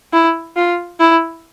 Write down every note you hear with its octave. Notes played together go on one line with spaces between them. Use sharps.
E4
F4
E4